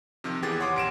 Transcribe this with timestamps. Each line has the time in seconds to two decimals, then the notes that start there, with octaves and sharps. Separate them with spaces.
0.24 C3 D#3 F3
0.42 E2 E3 G4 G#4 A6
0.60 C#5 F#5 C6 D6
0.76 A#1 D7 E7